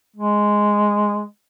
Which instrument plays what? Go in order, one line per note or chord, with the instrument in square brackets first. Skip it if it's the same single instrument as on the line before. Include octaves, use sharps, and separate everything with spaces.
[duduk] G#3